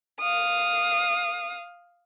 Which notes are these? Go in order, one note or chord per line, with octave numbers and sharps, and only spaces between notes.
F5 D#6